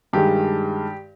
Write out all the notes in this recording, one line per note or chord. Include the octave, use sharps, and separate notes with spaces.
G2 D#3 G#3 G4